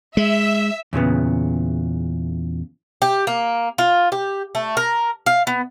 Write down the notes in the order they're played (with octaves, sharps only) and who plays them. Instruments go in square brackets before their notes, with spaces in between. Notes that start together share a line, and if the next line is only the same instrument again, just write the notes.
[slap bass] G#3 [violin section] E5
[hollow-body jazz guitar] E2 A#2 C#3 B3
[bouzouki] G4
A#3
F4
G4
A3
A#4
F5
B3